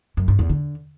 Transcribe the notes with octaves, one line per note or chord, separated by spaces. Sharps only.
F#2
G2
E2
D3